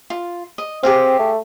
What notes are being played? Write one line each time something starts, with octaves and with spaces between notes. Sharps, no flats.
F4
D#5
C4 G4 G#4 F5
A3